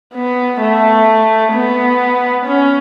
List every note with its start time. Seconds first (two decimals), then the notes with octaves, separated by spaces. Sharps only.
0.14 B3
0.61 A3
1.53 B3
2.46 C#4